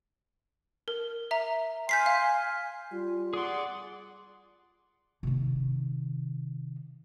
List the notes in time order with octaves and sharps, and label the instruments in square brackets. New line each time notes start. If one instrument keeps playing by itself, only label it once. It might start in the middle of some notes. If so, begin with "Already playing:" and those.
[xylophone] A#4
E5 A#5
[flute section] G#5 C6 F6 [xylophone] G6 B6 C7
[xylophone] F5
[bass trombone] G3 [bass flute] F4
[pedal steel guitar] G#4 C6 [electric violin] D5 F#5
[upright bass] C3 D#3